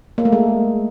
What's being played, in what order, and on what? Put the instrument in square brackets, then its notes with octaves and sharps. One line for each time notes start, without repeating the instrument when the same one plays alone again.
[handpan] A#3
A3
G#3